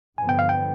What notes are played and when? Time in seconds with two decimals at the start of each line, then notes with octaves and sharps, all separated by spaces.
0.18 G2 D3 F3 B3 G#5
0.29 G5
0.39 F5
0.49 G5